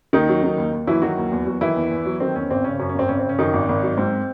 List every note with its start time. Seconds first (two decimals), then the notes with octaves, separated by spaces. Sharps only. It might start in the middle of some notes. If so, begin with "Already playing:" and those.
0.13 D#2 D#3 D#4
0.29 F#3
0.43 D#3
0.58 D#2
0.73 D#2
0.87 E3 F#3 E4
1.02 D#3 F#3 F#4
1.17 D#2
1.32 E2
1.47 F#3
1.61 D#3 E3 E4
1.76 E2
1.91 E2
2.06 F#3
2.20 D#3 C4
2.35 E2 C#4
2.50 G#1 C4
2.64 C#3 C#4
2.79 F#2 C#4
2.89 C#4
2.95 G#1 C4
3.08 G#1 C#4
3.19 C4
3.24 C#3
3.29 C#4
3.38 F#2 D#3 D#4
3.53 G#1
3.69 G#1
3.83 F#3
3.97 G#2 C4